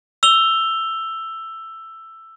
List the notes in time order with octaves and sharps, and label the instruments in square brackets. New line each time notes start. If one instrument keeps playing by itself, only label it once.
[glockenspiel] E6 F7 G7